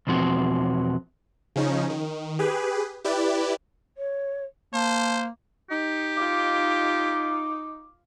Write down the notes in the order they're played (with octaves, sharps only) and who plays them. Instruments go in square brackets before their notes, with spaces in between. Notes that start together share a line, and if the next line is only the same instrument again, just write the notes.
[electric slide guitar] E2 B2 F3 C4 F#4
[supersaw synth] C#3 F3 C#4 D#4
D#3
G4 G#4 B4
E4 G4 B4 D5
[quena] C#5
[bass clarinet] A#3 [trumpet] C5 [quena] A5
[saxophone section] D#4 [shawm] G4
[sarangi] F4 [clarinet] D6